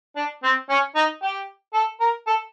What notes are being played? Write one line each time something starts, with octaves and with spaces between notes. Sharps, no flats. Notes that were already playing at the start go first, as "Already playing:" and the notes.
D4
C4
C#4
D#4
G4
A4
A#4
A4